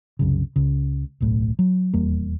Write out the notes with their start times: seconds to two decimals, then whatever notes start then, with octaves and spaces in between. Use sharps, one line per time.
0.19 C2 F#2 C#3
0.56 C#2 C#3
1.20 D1 B1 A2
1.59 F#3
1.94 D#1 E2 G3 A#3